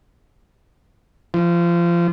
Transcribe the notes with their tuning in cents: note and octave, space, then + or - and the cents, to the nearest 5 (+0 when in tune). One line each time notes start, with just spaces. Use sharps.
F3 -25